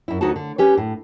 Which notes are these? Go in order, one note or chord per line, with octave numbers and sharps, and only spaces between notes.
F#2 E4
D2 D#4 F#4 A4 A5
D3
C#4 G4 B4
A2